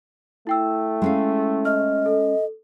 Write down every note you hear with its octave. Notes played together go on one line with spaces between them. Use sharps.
A3 E4 G5 E6
G#3 C#4 F5
D#5 F6
A4